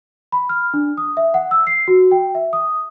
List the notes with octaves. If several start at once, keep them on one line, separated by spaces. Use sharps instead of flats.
B5
F6
D4
D#6
E5
F#5
E6
C7
F#4
G5
E5
D#6